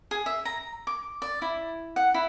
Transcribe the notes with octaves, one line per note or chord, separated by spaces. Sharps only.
G#4
E5
A#5
D6
D5
E4
F#5
E4